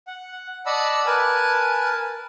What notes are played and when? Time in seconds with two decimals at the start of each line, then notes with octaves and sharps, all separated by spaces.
0.07 F#5
0.66 D5 D#5 F#5 A5 B5 E6
1.06 A#4 B4 G#5 A5